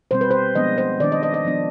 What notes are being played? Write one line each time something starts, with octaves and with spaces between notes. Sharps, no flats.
B2 G3 C4 C5
B4
C5
F3 G#3 B3 D4 D#5
C5
D#3 B3 D4 D5
D#5
D#5
D#5
F3 B3 D4